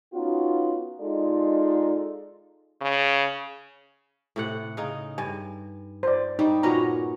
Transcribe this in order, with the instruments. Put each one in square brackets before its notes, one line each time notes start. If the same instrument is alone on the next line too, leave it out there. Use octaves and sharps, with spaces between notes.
[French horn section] B3 C#4 D#4 F4 F#4
G#3 D#4 F4 A4 D5
[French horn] C#3
[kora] A2 C3 F#5
C#3 D#4
[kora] G2 [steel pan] G#5
[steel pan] C5 D5
[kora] G3 [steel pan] D#4
[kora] A#2 B3 C#4 [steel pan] F#4 A#5